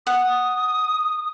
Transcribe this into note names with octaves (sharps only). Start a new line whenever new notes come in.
F#5 D#6